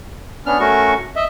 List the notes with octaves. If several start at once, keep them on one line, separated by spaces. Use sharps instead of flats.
B3 C#4 D4 F6
A3 C#4 F#4 A#4 C#6
D#5 E5